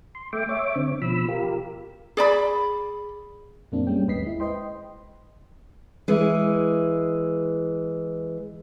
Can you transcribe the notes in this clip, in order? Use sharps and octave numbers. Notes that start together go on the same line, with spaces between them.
C6
A3 E5 G5 D6
C#5 E5 D6
D3 C4
B2 F3 B5 E6
F4 G4 A#4
G#4 D5 B5
F#2 A#2 F#3 A#3 C4 D4
G3 G#3 A#3 C#4 G5
G#1 D#2 B4 D#5 B6 C7
G#3 E4
B4 C5 D#5 G5 C6
E3 G#3